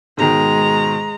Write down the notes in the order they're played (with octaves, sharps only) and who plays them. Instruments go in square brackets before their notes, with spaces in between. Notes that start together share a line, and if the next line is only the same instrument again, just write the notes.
[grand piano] G#2 B2 D#3 [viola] G#3 A#5